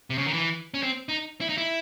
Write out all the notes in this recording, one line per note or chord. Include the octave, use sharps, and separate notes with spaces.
C3
C#3
D#3
E3
C#4
C4
D#4
E4
D#4
E4